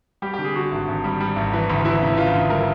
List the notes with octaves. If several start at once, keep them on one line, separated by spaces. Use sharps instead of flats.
G3 G4
D3 G4
G#4
D3 F#4
G#1
G#1
G3
G3
G#1
E3
D2
E3 E4
C#3
E3 F4
D2
G3 A#4